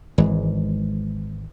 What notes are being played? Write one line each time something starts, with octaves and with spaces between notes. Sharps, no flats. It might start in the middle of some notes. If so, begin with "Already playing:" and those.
G#1 E3 G#3